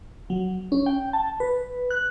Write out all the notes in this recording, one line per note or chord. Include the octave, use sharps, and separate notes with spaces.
F#3
C#4
G5
A5
B4
F#6